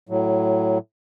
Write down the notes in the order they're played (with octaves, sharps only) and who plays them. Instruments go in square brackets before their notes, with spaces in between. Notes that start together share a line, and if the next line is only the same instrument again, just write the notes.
[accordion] A2 F#3